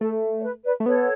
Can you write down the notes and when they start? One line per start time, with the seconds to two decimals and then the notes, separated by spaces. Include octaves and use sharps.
0.01 A3 A4
0.39 C#5
0.43 B4
0.65 B4 D5
0.80 A3
0.86 B3 A4 C#5